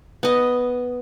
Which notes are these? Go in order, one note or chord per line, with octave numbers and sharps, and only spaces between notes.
B3 D#5